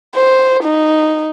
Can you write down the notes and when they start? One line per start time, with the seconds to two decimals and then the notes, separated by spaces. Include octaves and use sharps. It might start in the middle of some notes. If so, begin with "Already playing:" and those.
0.15 C5
0.63 D#4